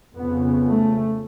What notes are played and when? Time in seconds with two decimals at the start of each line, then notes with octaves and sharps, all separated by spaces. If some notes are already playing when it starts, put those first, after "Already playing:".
0.16 F2 C#3 B3
0.66 A3